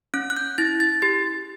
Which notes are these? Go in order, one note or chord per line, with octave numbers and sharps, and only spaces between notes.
C#4 F#6
F#6
G6
E4 A6
A6
G4 A6